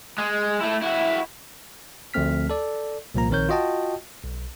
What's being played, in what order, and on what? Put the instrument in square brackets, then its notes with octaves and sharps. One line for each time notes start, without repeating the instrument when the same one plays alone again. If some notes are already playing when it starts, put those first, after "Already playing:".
[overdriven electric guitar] G#3
A3 E4
E4 F#4
[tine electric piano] D2 F3 A3 C4 F6 B6
A4 D5
C2 A#2 F3 A#3 A#5
A#1 D#3 C4 A#4 C#5 G6
F4 F#4 D#5 G5 A5
B1